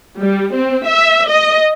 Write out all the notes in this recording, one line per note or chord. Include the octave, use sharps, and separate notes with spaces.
G3
C4
E5
D#5